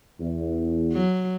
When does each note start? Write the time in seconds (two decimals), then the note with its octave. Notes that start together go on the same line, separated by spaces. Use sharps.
0.20 E2
0.93 F#3